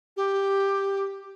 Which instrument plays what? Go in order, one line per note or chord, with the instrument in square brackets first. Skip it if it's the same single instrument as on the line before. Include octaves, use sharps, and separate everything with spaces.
[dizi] G4